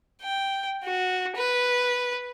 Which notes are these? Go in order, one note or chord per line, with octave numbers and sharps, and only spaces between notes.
G5
F#4
B4